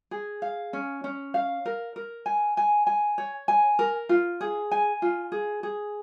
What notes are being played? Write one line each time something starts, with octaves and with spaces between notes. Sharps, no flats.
G#4
F5
C#4
C#4
F5
A#4
A#4
G#5
G#5
G#5
C#5
G#5
A#4
F4
G#4
G#5
F4
G#4
G#4